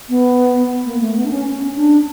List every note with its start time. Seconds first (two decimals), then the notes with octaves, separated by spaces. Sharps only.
0.09 B3
0.85 A#3
1.00 A3
1.16 B3
1.25 D4
1.31 C#4
1.46 C#4
1.76 D4